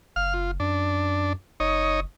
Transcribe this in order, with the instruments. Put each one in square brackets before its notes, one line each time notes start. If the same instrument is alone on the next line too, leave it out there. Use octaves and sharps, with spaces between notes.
[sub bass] F#1 [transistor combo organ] F5 F6
[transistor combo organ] F4
[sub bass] F#2 [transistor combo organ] D4
[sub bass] F#1 [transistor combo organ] D#4 C#5 D#5